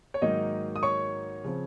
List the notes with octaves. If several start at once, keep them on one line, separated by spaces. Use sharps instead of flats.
C#5
G#2 D#3 F#3 A#3 D#4 D#5
D#6
C#5 C#6
C#3 F3 C4